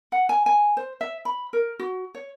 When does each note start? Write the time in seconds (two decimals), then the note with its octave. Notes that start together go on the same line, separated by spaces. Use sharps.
0.12 F#5
0.29 G#5
0.46 G#5
0.77 C5
1.01 E5
1.25 B5
1.53 A#4
1.79 F#4
2.15 C#5